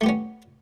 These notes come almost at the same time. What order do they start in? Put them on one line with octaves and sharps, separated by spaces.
A3 G4 B3 C#4